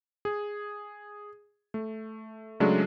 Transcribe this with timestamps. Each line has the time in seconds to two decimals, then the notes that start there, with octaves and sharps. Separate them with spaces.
0.25 G#4
1.74 A3
2.60 C#3 F#3 G#3 A3 D4